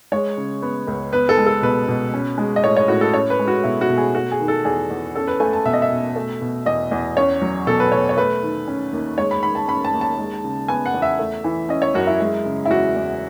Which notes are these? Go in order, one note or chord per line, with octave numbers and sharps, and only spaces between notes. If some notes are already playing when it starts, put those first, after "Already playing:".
G#3 C#5
C#3
B3
C#2
B3 B4
A4
G#3
A4
B2 B4
B2
C#4
G#3
D#5
A2 C#5
C#5
A2 F#4
A4
C#4 C#5
B4
G#3
F#4
B2 E4
F#4
B2
G#4
A3 F#4
G#4
D#3
A4
E2 G#4
E2
C#4 A4
B4
A3 G#5
A5
B2 E5
D#5
E5
B2
A3
B2
E2 D#5
E2
C#4 C#5
F#3
B2 A4
B4
B2 C#5
C#5
A3 B4
D#3
C#4
D#2
G#3 C#5
B5
D#3 B5
A5
C#4 B5
A5
D#2
A5
G#3
C#3
B3 G#5
F#5
E2
E5
A3
E3
C#4 D#5
C#5
F#2 F#4
E4
G#3
C#3
E4
E2 F#4
E2